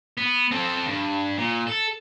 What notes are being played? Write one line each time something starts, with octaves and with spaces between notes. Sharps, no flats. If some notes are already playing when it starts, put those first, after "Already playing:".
B3
C4 A4
G2
A#2
A4